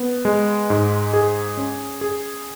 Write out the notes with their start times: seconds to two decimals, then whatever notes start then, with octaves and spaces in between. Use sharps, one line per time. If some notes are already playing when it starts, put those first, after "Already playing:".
Already playing: B3
0.25 G#3
0.70 G#2
1.14 G#4
1.57 C#4
2.01 G#4